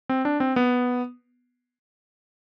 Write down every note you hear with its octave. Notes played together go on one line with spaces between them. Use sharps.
C4
D4
C4
B3